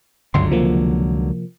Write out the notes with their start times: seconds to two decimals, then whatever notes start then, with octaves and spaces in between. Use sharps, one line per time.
0.34 G1 C#2 D3 F#3 C6
0.50 C3 F3 A#3